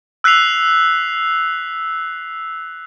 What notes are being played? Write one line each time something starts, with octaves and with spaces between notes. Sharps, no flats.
E6 F#6 B6 C7 F7